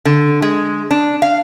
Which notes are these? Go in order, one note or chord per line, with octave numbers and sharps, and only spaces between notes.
D3
G#3
D4
F5